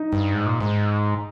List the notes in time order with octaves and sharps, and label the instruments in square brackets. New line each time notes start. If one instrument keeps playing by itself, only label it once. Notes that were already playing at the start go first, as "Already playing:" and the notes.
Already playing: [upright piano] D#4
[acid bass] G2
G#2
A#2
G#2